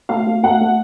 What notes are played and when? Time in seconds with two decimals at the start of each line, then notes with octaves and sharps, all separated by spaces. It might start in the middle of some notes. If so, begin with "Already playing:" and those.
0.09 A3 F5
0.27 A3
0.43 A3 F#5
0.61 A3